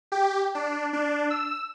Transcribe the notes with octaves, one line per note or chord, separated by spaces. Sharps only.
G4
D4
D4
E6